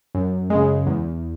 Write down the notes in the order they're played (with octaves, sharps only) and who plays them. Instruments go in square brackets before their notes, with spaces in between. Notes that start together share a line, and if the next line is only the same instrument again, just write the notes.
[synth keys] F#2
C#3 G#3
E2